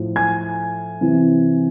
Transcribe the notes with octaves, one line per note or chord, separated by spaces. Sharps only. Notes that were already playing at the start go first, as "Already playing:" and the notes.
Already playing: A2 F3
G#5 G#6
C3 E3